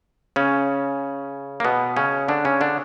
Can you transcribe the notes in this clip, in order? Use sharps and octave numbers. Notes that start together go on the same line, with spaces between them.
C#3 C#4
A#3
B2 B3
C#3 C#4
D3 D4
C#3 C#4
D3 D4